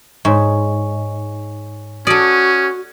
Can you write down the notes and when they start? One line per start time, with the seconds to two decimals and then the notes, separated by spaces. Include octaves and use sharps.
0.25 G#2 C#5 G#5 C#6
2.07 C#4 F#4 A4 D5 D#6 D#7